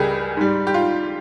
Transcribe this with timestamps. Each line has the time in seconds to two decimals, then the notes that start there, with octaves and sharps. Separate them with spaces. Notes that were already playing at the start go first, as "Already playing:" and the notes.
Already playing: C#2 C#3 G3 G4 G#4 A#4
0.37 G#2 G3
0.67 G4
0.74 F4